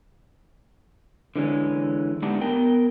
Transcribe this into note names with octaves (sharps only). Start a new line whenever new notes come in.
D3 E3 G#3 C#4
G#3 A3 B3 D4 D#4 G4
B3 A#4 G5